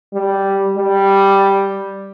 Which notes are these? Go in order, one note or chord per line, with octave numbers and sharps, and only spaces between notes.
G3
G3